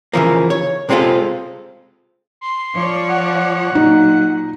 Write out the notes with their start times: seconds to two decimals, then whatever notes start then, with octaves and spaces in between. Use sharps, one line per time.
0.13 C#3 E3 F3 A#3
0.50 C#5
0.89 C3 G#3 C4 C#4 F4 A4
2.41 C6
2.73 F3 C#5 D5
3.08 F#5
3.75 A#2 F#3 D#4